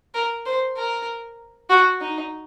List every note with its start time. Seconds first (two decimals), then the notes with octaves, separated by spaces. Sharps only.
0.14 A#4
0.46 C5
0.77 A#4
1.70 F#4
2.01 D#4